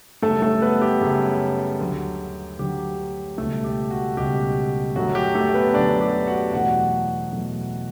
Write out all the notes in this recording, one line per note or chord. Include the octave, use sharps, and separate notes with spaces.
F#2 C#3 G3 A3 A4
A3 A4
B3 B4
G4
F#2 C#3 G3
D2 D3 F#3
D2 D3 F#3 G4
C#2 B2 G3 A3 A4
G4
F#4
C#2 B2 G3 G4
F#2 D3 F#3 A3 F#4
G4
A3 A4
B3 B4
F#2 D3 F#3 A3 D4 D5
G4
F#4 F#5
E2 B2 F#3 A3 F#4 F#5
B2 F#3 A3